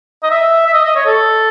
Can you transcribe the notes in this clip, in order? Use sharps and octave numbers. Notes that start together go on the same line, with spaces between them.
D#5
E5
E5
D#5
D#5
C#5
A4